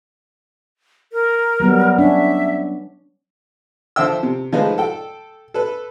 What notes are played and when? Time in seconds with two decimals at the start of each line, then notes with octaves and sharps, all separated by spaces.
1.13 A#4
1.60 F#3 G3 B3
1.98 C#4 D4 E5
3.96 D3 F3 C5 E5 G5 E6
4.23 C3
4.53 F3 G#3 A3 D#4 F4 B4
4.78 A4 G5
5.54 A4 B4